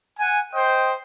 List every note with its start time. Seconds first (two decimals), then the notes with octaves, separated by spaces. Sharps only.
0.19 F#5 G#5
0.53 C5 D#5 G5